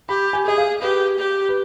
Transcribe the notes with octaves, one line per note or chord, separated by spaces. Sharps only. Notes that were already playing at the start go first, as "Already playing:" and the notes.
G4 B5
G#5
G#4 D#5
F5
G4 B4
G4
B4